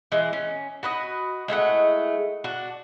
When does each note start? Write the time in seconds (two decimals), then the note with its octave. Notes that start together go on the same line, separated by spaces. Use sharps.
0.12 E3 G#3
0.33 C#4
0.83 F#4 B4 D#5
1.48 G#3 A3 E4 F#5
2.44 D4 F#4